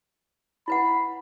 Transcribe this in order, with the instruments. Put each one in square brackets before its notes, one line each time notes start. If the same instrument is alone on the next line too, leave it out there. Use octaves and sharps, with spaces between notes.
[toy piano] E4 B4 F#5 [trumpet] B5